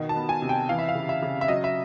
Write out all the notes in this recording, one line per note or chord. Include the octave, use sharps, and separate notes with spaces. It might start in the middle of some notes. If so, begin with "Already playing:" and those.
Already playing: B2 D#3
A5
B3
G#5
C3
G5
E3 F5
E5
F5
C#3
E5
C#3
E5
F#3 D#5
E5